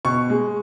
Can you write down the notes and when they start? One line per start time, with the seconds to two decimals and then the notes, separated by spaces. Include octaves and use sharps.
0.05 B2 C#6
0.30 G#3